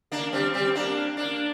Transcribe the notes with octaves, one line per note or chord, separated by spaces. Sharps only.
A#3 D4
G3 C4
G3 C4
A#3 D4
A#3 D4